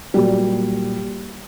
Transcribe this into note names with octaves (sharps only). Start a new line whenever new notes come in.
A#2 F#3 G3